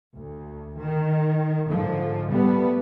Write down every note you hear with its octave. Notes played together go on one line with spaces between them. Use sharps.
D2
D#3
G#2 D3 F3
G3 A3 B3